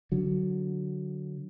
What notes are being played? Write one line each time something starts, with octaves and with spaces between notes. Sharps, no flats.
D3 F#3